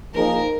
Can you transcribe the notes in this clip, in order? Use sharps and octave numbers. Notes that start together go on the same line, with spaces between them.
F3 A#3 D#4 G#4 A#4